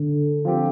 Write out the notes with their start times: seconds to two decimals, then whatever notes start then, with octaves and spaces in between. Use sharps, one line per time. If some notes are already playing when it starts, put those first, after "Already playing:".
Already playing: D3
0.45 F3 C4 G4